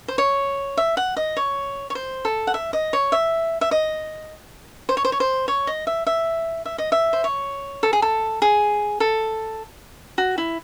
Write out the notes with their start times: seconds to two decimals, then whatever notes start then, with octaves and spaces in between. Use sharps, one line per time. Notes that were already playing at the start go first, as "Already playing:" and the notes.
0.08 C5
0.18 C#5
0.77 E5
0.97 F#5
1.17 D#5
1.37 C#5
1.90 C#5
1.95 C5
2.25 A4
2.47 F#5
2.54 E5
2.73 D#5
2.93 C#5
3.12 E5
3.61 E5
3.71 D#5
4.89 C5
4.97 C#5
5.05 C5
5.12 C#5
5.20 C5
5.48 C#5
5.67 D#5
5.87 E5
6.07 E5
6.65 E5
6.78 D#5
6.92 E5
7.13 C5
7.24 C#5
7.83 A4
7.93 G#4
8.02 A4
8.42 G#4
9.00 A4
10.18 F#4
10.38 E4